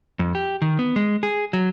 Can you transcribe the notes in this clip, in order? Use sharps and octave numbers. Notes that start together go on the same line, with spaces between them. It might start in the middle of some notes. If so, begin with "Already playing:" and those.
F2
G4
D#3
B3
G#3
G#4
F#3